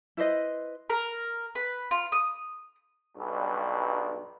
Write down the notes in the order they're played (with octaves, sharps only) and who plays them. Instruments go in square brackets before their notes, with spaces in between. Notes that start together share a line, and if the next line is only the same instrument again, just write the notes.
[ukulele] E4 B4 C5 D#5
[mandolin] A#4
B4
F4
D#6
[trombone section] B1 G2